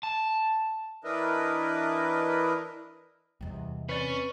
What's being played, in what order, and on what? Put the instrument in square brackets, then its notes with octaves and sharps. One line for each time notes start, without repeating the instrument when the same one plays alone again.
[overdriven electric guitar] A5
[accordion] E3 D4 E4 A#4 B4 D#5
[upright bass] E2 C3 [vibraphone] G3 D#5
[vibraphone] C4 C#6 [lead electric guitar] C#4 [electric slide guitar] B4 D5